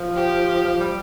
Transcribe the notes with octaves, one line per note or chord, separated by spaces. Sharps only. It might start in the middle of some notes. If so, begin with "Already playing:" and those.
Already playing: F3
G4
F3
G3